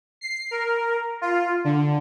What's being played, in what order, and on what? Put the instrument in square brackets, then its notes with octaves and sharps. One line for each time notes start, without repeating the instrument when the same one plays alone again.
[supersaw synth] C7
A#4
F4
D3